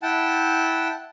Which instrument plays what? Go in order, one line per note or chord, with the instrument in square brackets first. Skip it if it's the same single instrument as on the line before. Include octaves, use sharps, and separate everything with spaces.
[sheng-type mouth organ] E4 F#5 G5 A5